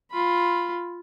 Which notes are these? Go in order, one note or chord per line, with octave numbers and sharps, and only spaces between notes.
F4 B5